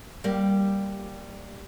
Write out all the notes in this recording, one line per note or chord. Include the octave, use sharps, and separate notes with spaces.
G3 A#3